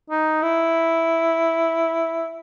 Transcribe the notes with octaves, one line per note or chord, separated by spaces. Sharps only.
D#4
E4